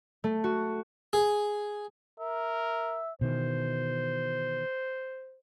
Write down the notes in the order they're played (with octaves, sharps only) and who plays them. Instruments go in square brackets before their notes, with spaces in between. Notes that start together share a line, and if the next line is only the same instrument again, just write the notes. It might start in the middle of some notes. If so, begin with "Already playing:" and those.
[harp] A3
F#4
[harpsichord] G#4
[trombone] A#4 [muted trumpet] E5
[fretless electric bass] B2 D#3 E3 [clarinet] C5